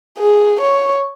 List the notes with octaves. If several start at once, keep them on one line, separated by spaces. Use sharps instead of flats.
G#4
C#5